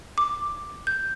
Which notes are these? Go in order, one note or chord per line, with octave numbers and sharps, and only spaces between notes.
D6
G6